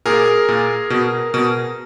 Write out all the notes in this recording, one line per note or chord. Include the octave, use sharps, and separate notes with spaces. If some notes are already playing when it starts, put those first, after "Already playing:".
A#2 G#4 A#4
A#2
B2
B2